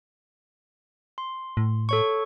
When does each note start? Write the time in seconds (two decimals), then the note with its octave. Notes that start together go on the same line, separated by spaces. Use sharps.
1.18 C6
1.57 A2
1.89 A4 C#5 C#6